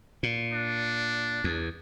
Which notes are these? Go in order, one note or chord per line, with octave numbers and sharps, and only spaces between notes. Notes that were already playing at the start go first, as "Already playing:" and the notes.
A#2
D4
E2